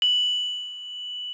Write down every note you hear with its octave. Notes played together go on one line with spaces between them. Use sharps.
F#7